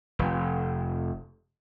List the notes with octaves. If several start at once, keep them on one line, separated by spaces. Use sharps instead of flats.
F1